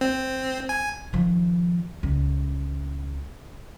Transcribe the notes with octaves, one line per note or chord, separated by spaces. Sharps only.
C4
G#5
D#3 F3
C#2